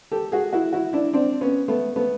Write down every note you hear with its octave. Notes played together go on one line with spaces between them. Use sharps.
G4 A4
F#4 G#4
E4 F#4
E4 F#4
D4 E4
C4 D4
B3 C#4
A3 B3
A3 B3